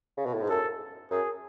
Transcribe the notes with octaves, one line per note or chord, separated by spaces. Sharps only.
C#3
B2
A2
G#2
F#2 A4
F#2 G#4